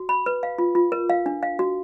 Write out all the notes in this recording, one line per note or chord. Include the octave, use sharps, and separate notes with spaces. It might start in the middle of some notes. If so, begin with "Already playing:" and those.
Already playing: F#4
B5
B4
F5
F4
F4
A#4
F5
D4
F5
F#4